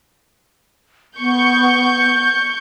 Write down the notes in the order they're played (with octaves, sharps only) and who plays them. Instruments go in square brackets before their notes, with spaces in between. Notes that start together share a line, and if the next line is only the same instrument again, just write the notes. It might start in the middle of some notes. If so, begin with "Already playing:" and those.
[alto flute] B3 [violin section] C#6 G6